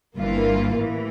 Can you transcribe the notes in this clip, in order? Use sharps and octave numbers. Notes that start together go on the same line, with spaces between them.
G1 G2 E3 A#3 F4
A1 A2 E3